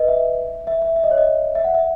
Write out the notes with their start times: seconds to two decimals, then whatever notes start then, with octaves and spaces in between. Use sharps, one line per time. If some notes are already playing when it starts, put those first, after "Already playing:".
Already playing: B4 D#5
0.08 E5
0.67 E5
0.82 E5
0.96 E5
1.04 D#5
1.11 C#5
1.18 D#5
1.55 E5
1.65 F#5
1.74 E5